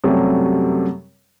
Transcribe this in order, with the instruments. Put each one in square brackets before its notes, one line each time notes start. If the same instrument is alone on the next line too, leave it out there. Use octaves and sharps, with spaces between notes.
[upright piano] F#2 C3 F#3 G3 A3